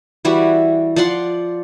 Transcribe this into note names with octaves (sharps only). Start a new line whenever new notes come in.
E3 G3 E4 F#4
F3 D5 F#5 C6